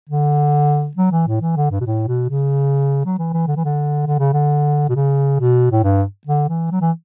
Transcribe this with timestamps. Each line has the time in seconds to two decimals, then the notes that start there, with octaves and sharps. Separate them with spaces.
0.09 D3
0.97 F#3
1.12 E3
1.27 A2
1.41 E3
1.56 D3
1.71 G2
1.81 B2
1.86 A2
2.08 B2
2.29 C#3
3.05 F#3
3.19 E3
3.33 E3
3.47 D3
3.56 E3
3.64 D3
4.06 D3
4.19 C#3
4.33 D3
4.89 B2
4.95 C#3
5.39 B2
5.71 A2
5.83 G2
6.27 D3
6.49 E3
6.71 F#3
6.81 E3